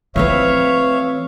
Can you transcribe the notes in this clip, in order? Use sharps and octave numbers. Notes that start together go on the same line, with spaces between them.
E3 F3 A3 C4 B4 C#5 E5 F5